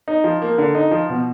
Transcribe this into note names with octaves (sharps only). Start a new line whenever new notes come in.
D#4
F3
A#3
D3
D#4
F3
B2